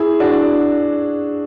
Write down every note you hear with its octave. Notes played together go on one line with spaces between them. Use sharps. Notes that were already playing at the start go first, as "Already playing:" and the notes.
Already playing: E4 G#4
D4 F#4